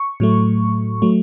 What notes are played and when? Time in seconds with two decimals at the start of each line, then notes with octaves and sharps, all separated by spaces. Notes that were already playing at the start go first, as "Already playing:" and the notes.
Already playing: C#6
0.20 A2 F#3 A3
1.02 F#3 A3